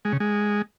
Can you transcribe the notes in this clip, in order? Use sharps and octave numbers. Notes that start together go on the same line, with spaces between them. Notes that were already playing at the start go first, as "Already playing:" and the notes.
G#3
C#3
G#3